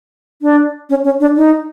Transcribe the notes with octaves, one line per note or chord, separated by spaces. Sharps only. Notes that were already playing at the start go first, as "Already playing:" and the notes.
D4
C#4
C#4
D4
D#4